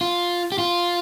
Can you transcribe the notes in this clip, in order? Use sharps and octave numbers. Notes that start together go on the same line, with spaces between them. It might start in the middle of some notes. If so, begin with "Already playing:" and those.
F4
G4
F4